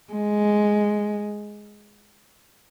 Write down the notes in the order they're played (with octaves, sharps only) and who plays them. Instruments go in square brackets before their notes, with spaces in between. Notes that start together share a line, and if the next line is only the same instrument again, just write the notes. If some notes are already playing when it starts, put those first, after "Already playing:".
[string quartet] G#3